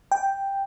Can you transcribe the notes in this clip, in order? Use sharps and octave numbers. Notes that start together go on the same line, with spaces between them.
G5